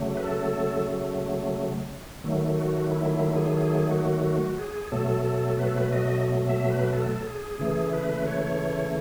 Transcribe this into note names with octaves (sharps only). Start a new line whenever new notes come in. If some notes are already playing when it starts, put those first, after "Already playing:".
Already playing: C#3 F#3 A3
B4
A4
D#3 F#3 A3
F#4
E4
E4
G#4
G#4
F#4
F#4
G#4
B2 F#3 A3 A4
A4
B4
A4
B4
D#5
E5
B4
A4
G#4
C#3 E3 A3 G#4
B4
C#5